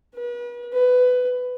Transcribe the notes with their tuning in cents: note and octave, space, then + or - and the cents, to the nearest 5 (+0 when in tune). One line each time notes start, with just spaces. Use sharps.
B4 -40
B4 +15